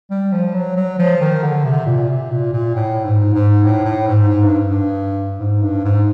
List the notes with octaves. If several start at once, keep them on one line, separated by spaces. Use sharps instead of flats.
G3
F3
F#3
F#3
F3
D#3
D3
C3
A#2
C3
A#2
A#2
A2
G#2
G#2
A2
A2
G#2
G#2
G2
G2
G#2
G2
G#2